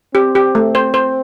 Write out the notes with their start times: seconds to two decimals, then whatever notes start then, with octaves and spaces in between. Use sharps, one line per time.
0.15 C4 G4
0.35 G4
0.55 A3
0.75 C5
0.94 C5